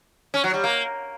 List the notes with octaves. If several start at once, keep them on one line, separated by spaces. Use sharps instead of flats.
C#4
F#3
G3
A#3